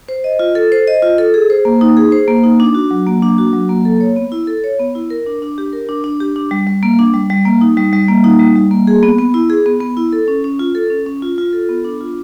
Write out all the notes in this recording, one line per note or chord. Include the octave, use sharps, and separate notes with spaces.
C5
D#5
F4
A4
C5
D#5
F4
A4
G#4
C5
A#3
D#4
G#4
C5
A#3
D#4
D4
F#4
F#3
A#3
D4
F#4
F#3
A#3
A4
C#5
B3
E4
A4
C#5
B3
E4
A#4
D4
D4
G4
A#4
D4
D4
G4
D4
G3
G3
A#3
D4
G3
G3
A#3
D#4
G3
G3
A#3
D#4
G3
G3
A#3
G#4
B3
B3
E4
G#4
B3
B3
E4
A4
C#4
C#4
F4
A4
C#4
C#4
F4
F4
A4
B3
D4
F4